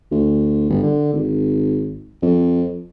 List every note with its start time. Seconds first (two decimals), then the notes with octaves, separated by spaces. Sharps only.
0.11 D2
0.70 G1
0.83 D3
1.13 G#1
2.22 F2